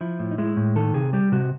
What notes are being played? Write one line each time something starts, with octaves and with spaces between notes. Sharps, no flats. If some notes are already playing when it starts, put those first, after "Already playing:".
F3 E4
A2
D#4
G#3 E4
A2
D#3 A4
C3 G#4
G3 G4
C3 F#4